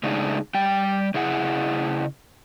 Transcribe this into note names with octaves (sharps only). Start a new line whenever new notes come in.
C#3 G#3 A3 D4 D#4 G#4
G3 G5
C#3 E4 G#4 F#5